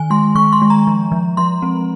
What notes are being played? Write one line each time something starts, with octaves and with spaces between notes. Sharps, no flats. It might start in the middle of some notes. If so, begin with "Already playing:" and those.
Already playing: D#3 G#5
G#3 C6
D#3 C#6
C6
G#3
A#5
F3
F3
F3 C6
C4